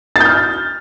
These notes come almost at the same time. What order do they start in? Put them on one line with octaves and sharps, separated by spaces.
A6 G6 F6